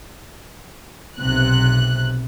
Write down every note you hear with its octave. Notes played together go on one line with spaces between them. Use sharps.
B1 C3 F#6